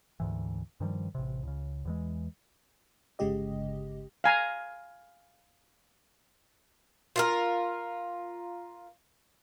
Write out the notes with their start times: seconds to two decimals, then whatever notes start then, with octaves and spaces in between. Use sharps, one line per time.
0.20 D2 G#2 E3
0.80 G2 D#3 F3 G3
1.15 A1 C3
1.43 C#2 C#3
1.85 E2 E3 G#3
3.19 G1 C#3 G#3 G4 D#5
4.24 F5 G#5 A#5
7.16 F4 F#4 A#4